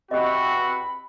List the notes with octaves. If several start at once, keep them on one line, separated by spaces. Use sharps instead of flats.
E2 C4 F#4 G4 D#5 B5